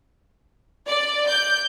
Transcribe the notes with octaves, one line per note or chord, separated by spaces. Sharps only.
D5
G6